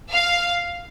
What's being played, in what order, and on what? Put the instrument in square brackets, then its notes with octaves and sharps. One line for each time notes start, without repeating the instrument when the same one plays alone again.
[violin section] F5